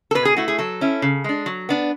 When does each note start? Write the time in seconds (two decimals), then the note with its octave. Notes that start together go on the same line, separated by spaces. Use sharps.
0.11 A4
0.15 B2 B4
0.25 G#4
0.36 A3 E4 F#4
0.48 G#4
0.59 F#3 A4
0.81 C#4 E4
1.02 C#3
1.24 G#3 D4
1.46 F#3
1.69 B3 D4